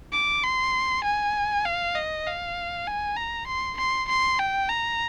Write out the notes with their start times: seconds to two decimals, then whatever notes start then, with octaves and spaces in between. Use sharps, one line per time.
0.13 D6
0.44 C6
1.04 G#5
1.65 F5
1.95 D#5
2.27 F5
2.87 G#5
3.17 A#5
3.47 C6
3.78 C6
4.09 C6
4.39 G5
4.69 A#5